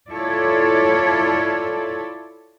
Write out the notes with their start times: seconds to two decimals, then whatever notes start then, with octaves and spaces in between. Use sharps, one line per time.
0.10 E4 F4 A4 C#5 D5